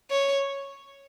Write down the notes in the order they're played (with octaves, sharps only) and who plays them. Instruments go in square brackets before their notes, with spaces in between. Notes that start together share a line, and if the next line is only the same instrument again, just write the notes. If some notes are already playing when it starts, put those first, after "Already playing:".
[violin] C#5